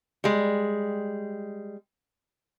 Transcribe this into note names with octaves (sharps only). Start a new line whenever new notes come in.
G3 G#3